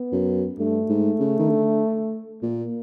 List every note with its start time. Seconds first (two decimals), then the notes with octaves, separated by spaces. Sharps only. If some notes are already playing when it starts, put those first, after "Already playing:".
Already playing: B3
0.12 F#2
0.58 G2 A3
0.89 G#2
1.19 C#3
1.39 D#3
1.50 D3
2.42 A#2 A#3